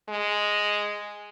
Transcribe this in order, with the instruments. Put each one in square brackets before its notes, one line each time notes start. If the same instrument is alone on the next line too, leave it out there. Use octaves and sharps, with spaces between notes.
[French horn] G#3